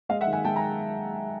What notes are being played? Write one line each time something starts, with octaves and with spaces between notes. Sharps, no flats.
G#3 D#5 F5
E5 F#5
D#3
F#5 G#5
G#3 G5 A5
G#5 A#5